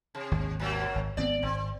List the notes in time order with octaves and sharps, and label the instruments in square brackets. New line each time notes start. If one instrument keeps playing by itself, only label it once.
[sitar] C3
[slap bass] G#1 D#2
[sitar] B2 F#3 A#3
[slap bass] G#1
[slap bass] G#1 B3 C4 [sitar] D5
[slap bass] G#1 [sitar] C4